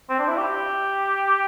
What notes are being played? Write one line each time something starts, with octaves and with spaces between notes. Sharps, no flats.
C4
D4
E4
G4